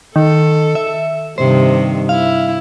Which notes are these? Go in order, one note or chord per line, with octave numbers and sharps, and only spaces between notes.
D#3 A4
E5
G2 C3 D#3 C5
E4 F5